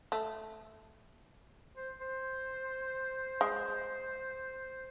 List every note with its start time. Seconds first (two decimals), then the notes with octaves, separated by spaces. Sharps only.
0.12 A3
1.76 C5
2.01 C5
3.41 G#3